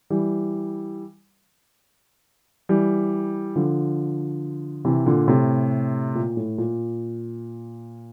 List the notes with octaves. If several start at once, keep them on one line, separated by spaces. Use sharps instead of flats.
E3 G3
E3 G3
D3 F3
C3 E3
A#2 D3
A2 C3
A#2
A2
A#2